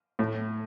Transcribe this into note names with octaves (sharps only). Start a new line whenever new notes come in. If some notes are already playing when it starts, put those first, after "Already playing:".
A2